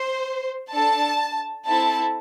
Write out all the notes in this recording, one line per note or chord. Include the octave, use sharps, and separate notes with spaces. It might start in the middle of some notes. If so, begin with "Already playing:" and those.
Already playing: C5
D4 A4 A5
C4 E4 A4 A5